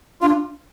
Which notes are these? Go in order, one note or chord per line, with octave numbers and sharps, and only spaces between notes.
D4 F4